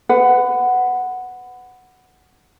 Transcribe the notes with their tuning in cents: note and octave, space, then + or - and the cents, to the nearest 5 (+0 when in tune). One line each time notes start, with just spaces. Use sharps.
B4 +25 F#5 +0